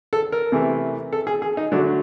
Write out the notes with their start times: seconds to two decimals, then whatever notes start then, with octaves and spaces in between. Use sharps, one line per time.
0.13 A4
0.32 A#4
0.52 C3 E3 A3
1.13 A4
1.27 G#4
1.42 G#4
1.57 D#4
1.72 D3 F#3 A3 D4